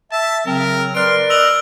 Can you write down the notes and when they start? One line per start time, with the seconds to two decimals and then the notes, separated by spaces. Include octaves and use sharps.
0.11 E5 A5
0.46 C#3 F#3 C4 A#4
0.95 A#4 B4 D5 C6 F6 D7
1.30 D#5 E6 F7 F#7